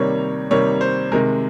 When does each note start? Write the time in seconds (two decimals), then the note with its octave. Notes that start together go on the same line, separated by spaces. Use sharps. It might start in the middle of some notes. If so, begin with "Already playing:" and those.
Already playing: C3 D#3 G3 A#3 C#5
0.51 C3 D#3 G3 A#3 C#5
0.81 C5
1.12 C3 D#3 G#3 A#4